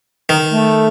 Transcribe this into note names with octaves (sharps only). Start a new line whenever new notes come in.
D#3
A3